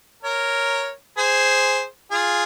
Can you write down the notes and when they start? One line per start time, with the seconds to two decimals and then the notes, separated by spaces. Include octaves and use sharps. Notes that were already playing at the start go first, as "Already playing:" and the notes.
0.23 A#4 C#5
1.17 G#4 C5
2.11 F4 G#4